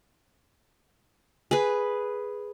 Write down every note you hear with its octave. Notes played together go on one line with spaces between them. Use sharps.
G#4 B4